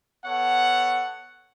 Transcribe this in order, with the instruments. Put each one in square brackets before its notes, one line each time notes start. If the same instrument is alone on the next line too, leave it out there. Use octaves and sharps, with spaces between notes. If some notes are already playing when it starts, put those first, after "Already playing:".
[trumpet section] B3 A4 C#5 F#5